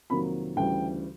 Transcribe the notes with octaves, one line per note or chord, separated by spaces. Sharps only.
F2 C3 D#3 F#3 A#3 B5
D2 C#3 E3 G3 G5